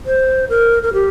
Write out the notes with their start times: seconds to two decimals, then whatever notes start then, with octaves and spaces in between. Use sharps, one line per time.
0.06 C5
0.49 A#4
0.83 A#4
0.93 G4